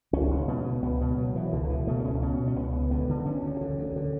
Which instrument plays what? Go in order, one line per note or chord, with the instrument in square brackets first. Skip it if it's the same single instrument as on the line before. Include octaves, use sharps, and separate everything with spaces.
[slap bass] C#2 C#4
C#2
B2 B3
B2
C#2 B3
B2 B3
B2 F#3
B2 E3
C#2 D3
D3
B2 E3
B2 A3
C#2 C#4
B2 C#4
B2
C#4
C#2 B3
C#2
D3 B3
D3
D2 C#4
D2
D3
D2
D3